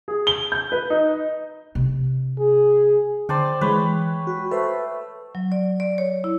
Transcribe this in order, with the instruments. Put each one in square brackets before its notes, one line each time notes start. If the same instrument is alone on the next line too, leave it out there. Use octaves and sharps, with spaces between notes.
[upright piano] G#4
G7
G6
B4
D#4
[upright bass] C3 D4
[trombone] G#4
[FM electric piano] D3 A5 [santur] C5 D5 G5
[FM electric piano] E3 G#3 [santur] B4 C#5
[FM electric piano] F#4
[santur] A3 [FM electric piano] A4 B4 C5
[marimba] F#3
D5
D5
C#5
E4